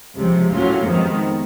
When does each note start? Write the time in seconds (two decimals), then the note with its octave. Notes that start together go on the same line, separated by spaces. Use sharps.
0.17 C#2 C3 F3
0.52 A2 F#3 A#3 C#4 F4
0.87 F2 C3 D#3 G#3 B3